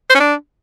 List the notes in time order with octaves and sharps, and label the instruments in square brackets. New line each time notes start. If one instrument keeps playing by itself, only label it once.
[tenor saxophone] C5
C#4
D4